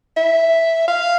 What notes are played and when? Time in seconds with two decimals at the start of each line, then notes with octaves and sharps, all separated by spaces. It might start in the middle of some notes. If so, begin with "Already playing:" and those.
0.17 E5
0.88 F5